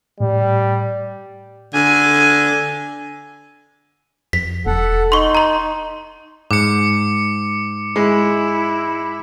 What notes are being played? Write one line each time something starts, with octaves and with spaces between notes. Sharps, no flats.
A2 G3
D3 G#5
F2 B6
E1 A4 F#5
D#4 C6 C#6
A#5 C6
G#2 D6 C#7
G#3 E4